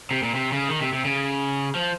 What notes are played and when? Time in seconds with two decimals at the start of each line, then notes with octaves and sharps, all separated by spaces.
0.11 C3
0.23 A#2
0.35 C3
0.52 C#3
0.69 D#3
0.81 C3
0.93 C3
1.05 C#3
1.75 F3